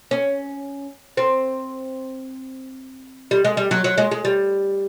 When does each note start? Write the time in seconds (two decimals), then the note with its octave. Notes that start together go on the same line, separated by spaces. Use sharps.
0.11 C#4
1.17 C4
3.31 G3
3.45 G#3
3.57 G3
3.71 F#3
3.84 F#3
3.98 G#3
4.11 G#3
4.25 G3